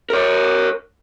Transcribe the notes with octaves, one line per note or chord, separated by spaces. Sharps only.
A#4 C#5